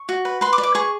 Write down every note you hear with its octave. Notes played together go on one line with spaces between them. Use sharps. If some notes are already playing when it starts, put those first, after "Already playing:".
Already playing: C#6
F#4
B4
B4 C6
D6
D5
D6
G#4 C#6